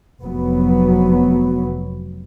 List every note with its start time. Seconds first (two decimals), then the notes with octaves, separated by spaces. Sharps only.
0.24 F1 F#3 B3